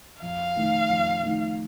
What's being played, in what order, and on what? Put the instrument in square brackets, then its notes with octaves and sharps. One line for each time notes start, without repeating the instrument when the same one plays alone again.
[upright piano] F2 [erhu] F5
[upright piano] D#3 A3 D#4
F2
D#3 A3 D#4